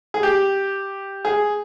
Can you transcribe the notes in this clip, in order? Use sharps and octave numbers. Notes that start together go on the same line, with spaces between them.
G#4
G4
G#4